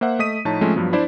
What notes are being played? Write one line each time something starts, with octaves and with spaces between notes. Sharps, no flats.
A#3 C5 E5 F#5
A3 D#5 D#6 B6 D#7
A2 F3 D#4 C#5 A5
F3 G#3 A3 C4 C#4 F4
G2 F3 F#3 B3
D4 E4 C5 D5 E5